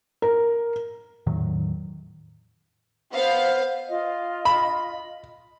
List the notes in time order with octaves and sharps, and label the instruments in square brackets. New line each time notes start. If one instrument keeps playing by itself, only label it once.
[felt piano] A#4
[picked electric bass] E2 A2 D#3 F#3
[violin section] B3 F5 [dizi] C5
[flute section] F4 D#5
[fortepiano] B5